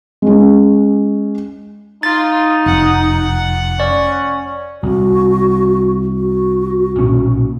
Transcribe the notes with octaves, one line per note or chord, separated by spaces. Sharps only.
G#3 C#4
D#4 F4 A6
F1 F#5
C#4 D5
C2 F#4
F#4
B1 A#2 C#4